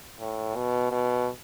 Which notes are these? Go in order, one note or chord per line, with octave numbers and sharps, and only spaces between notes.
A2
B2
B2